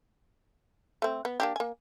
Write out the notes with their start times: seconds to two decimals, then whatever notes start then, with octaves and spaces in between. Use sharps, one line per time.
1.02 A3 C4
1.25 B3
1.40 A#3 D4 G4
1.56 A#3 G#5